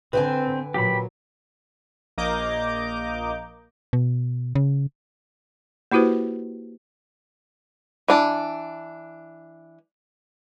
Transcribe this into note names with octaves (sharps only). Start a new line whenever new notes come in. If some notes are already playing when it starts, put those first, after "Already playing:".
D3 C4 B4 G5 G#5
A#2 F#3 G4 B5
A#1 A#3 D#5 A#5 D6 G6
B2
C#3
A#3 E4 F#4 G4 B4 C5
E3 D4 A5